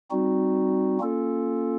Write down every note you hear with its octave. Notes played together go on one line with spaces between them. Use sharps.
G3 C4 D#4 F#4
A#3 C#4 F4 A4